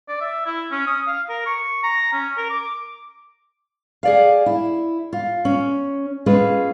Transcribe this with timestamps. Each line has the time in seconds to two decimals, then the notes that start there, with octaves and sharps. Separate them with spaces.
0.09 D5
0.21 E5
0.46 E4
0.72 C#4
0.87 D#6
1.07 F5
1.29 A#4
1.46 C#6
1.84 A#5
2.12 C#4
2.37 A#4
2.50 D6
4.03 G#4 D5 F5
4.46 E4
5.13 F4
5.45 C#4
6.26 G#3 C#4 F4 B4